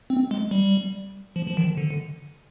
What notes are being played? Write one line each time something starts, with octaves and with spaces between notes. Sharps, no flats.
C4
G#3
G3
F3
F3
D#3
D3